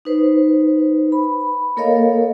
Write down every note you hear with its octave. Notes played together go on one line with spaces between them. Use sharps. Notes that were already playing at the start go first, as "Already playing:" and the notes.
D#4 B4 C5
B5
A#3 A4 A#4 C#5 D#5 F5